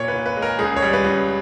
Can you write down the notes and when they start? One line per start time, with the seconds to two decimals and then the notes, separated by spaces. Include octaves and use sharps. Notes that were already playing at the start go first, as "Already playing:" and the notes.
Already playing: A#2 C#5
0.08 B4
0.14 A#2
0.26 B4
0.37 G#3
0.42 A#4
0.59 C#2 G#4
0.76 C#5
0.82 G3
0.93 B4
1.04 C#2